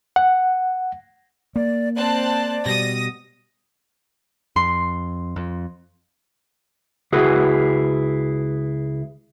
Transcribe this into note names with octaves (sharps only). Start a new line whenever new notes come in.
F#5
A#3 D5
C4 D5 A5 F#6
B2 G3 D#6 A#6
F2 C6
F2
C#2 E4 F#4 G#4 B4